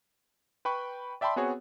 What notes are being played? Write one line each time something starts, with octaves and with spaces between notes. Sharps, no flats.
B4 G5 B5 C#6
D5 E5 G5 A5 B5 C6
B3 C4 F#4 G#4 C#5